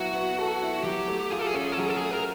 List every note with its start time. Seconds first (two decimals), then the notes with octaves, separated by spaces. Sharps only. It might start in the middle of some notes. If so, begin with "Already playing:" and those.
Already playing: F#3 B3 E4 F#4
0.15 B3
0.38 A4
0.62 E4
0.84 F#3 G4
1.08 A3
1.30 F4 G#4
1.39 A4
1.47 G#4
1.53 C#4 A4
1.64 G#4
1.72 A4
1.77 F#3 G#4
1.88 A4
1.97 A3 G#4
2.11 A#4